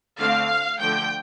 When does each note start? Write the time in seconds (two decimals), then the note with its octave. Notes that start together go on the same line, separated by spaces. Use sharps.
0.19 D3 A3 C4 F5
0.79 D3 F3 A3 G5